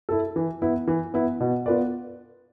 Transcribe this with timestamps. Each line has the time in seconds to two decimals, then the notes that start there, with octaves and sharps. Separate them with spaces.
0.09 E4 A4
0.36 E3
0.62 B3 E4
0.87 E3
1.14 B3 E4
1.40 B2
1.66 B3 F4 B4 D5